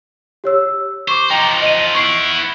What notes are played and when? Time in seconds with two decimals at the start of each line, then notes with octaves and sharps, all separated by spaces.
0.44 G4 C#5 E6
1.08 C5 C#6 D6
1.30 F3 D#4 G5 A#5
1.62 D#5 D#7
1.95 B3 E4 C#6 C7 D7